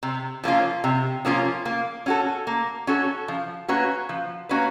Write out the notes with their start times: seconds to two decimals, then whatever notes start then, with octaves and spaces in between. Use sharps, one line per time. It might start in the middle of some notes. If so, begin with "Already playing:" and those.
0.03 C3
0.44 F3 A#3 C#4 F4
0.84 C3
1.25 F3 A#3 C#4 F4
1.65 A#3
2.06 C#4 F#4 A4
2.47 A#3
2.87 C#4 F#4 A4
3.28 F3
3.68 A#3 C#4 F#4 B4
4.09 F3
4.49 A#3 C#4 F#4 B4